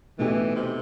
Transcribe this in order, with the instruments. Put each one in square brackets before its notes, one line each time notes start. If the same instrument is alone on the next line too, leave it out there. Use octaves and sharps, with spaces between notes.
[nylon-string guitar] B2 A3 D#4 G4 [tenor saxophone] E3
[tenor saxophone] C3